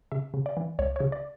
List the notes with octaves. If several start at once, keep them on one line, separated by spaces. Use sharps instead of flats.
C#3 E5
C#3
D5
E3
C#2 C#5
C#3 C#5
D5